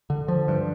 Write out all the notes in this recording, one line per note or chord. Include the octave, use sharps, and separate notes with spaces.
D3
F3
G2